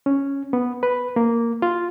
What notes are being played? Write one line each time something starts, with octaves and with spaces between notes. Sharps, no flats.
C#4
B3
B4
A#3
F4